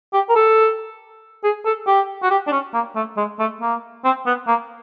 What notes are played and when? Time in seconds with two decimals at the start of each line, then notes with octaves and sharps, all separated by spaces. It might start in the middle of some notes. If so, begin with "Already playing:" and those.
0.13 G4
0.29 A#4
0.36 A4
1.44 G#4
1.66 A4
1.87 G4
2.22 F#4
2.30 G4
2.47 D4
2.52 C#4
2.74 A#3
2.96 A3
3.17 G#3
3.39 A3
3.61 A#3
4.04 C4
4.26 B3
4.48 A#3